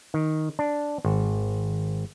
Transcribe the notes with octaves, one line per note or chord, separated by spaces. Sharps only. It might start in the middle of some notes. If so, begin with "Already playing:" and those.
D#3
D4
G#1